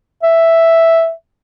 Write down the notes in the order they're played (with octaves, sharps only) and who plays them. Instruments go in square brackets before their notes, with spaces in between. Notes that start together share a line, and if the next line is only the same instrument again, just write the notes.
[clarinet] E5